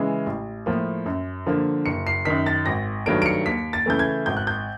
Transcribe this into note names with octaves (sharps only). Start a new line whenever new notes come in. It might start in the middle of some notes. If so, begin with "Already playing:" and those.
Already playing: C#3 E3 G#3
A1
A2 F3 A#3
F#2
D3 F3 A#3
F#1 C#7
C7
F#2 D#3 B6
A6
G#1 A#6
G2 D#3 F#3 A3 D7
D7
C#7
D#2 B6
A6
C#3 E3 A3 G6
G#6
G#1 G6
F#6
G6